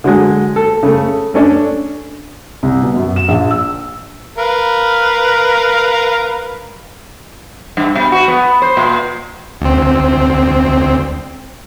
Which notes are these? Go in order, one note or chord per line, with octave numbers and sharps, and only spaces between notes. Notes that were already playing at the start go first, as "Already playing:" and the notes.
D3 F#3 G#3
A4
C#3 A3
A3 C#4 D4
C2
B2
F#2
E7
A#1
E6
A#4 B4 F5
G2
B2
F#4
B3
C5
A#2
D2 C4